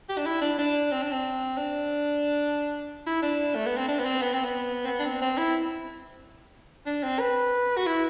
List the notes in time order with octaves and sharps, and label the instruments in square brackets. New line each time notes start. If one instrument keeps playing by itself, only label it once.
[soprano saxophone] G4
D4
E4
D4
D4
C4
D4
C4
D4
E4
D4
A3
B3
C4
D4
B3
C4
B3
C4
B3
C4
B3
D4
C4
C4
E4
D4
C4
B4
F#4
E4